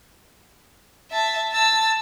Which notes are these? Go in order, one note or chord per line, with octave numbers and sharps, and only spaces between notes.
E5 A5
A5 E6